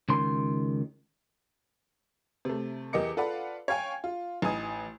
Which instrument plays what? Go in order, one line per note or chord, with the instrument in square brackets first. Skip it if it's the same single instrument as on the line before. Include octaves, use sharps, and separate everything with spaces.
[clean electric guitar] C#2 D#3 C6
[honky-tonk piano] C3 A3
E2 G4 A#4 D#5 D6 C#7
F4 A4 B4 D5 F5 F#5
C#5 F5 G5 G#5
F4
A1 D#4 G#5 D#6